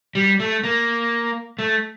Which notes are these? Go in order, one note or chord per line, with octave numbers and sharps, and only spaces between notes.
G3
A3
A#3
A3